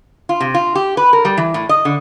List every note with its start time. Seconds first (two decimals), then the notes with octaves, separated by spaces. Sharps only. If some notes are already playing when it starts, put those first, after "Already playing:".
0.29 F4
0.41 C3
0.54 F4
0.75 G4
0.97 B4
1.13 A#4
1.25 G3
1.37 E3
1.54 A2
1.69 D#5
1.85 D3